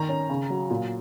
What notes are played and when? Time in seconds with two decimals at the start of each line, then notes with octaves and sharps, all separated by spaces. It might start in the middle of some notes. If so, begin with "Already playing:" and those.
Already playing: D#3 A#5
0.09 C#4
0.29 C#3
0.50 F#3
0.71 A#2